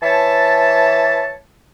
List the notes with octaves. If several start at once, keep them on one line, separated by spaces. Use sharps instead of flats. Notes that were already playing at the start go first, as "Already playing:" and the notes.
E3 C#5 E5 A5